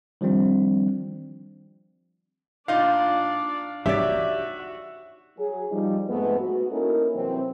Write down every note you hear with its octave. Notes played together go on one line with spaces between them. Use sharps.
D#3 F3 G3 C4 D4
A#2 D4 D#4 F4 D5 F5
D#4 F#4 G4 C#5 D5 E5
F#3 G#4
F3 G3 D#4
F2 G#2 A3 B3
F#4
A#3 C#4 D#4 E4 A4 A#4
C3 E3 F#3 C4